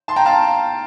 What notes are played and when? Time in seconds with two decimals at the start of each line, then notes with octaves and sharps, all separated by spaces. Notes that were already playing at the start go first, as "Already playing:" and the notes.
0.08 A5 C6
0.16 G5 A#5
0.26 F5 A5